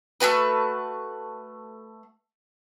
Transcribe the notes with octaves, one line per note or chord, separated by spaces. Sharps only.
A3 C#4 F#4 B4